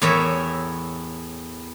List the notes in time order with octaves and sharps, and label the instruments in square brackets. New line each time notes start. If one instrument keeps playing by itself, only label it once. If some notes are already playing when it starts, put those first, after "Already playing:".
[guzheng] E2 A2 A#4 C#5 E5